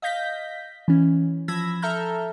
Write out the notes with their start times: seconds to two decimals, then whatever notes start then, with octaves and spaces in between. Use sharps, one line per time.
0.02 D#5 F5 G6 A#6 B6
0.88 E3 C#4
1.48 F3 B5 E6 G#6 A#6
1.82 A4 E5 A5 A#5 F6 G6